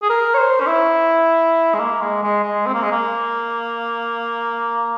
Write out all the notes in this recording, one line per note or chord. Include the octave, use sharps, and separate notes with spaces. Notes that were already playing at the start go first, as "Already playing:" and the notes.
G#4
A#4
C#5
C5
C#4
E4
G#3
A#3
G#3
G#3
G#3
C4
A#3
G#3
A#3